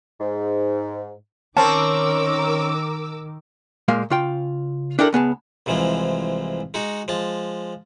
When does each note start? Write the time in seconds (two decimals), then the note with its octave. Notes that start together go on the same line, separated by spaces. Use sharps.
0.19 G#2
1.57 D#3 C4 C#4 A#4 A5 D6 E6
3.88 A#2 G#3 A#3 F5
4.10 C#3 F4 G5
4.99 D4 E4 G4 A4 A#4
5.13 C#2 B3 G#4 A5
5.66 C2 G#2 E3 F3 G#3
6.74 G#3 D#4 F#4
7.08 F3 G#3 A5